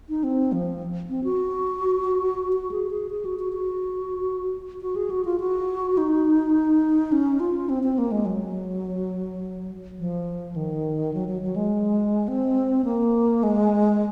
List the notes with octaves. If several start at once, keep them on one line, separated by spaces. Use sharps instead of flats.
D#4
C4
F3
C4
F#4
F#4
G#4
G#4
G#4
F#4
F#4
F#4
F#4
G#4
F#4
F4
F#4
D#4
C#4
F4
C4
C4
A#3
G#3
F#3
F3
D#3
F#3
F#3
F#3
G#3
C4
A#3
G#3